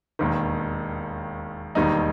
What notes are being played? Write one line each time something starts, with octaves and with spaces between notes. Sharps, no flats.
E1 D#2 D#3
E1 D#2 D#3 G3 D#4